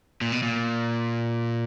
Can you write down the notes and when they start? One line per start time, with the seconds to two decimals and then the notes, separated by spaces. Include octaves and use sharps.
0.21 A#2
0.32 B2
0.43 A#2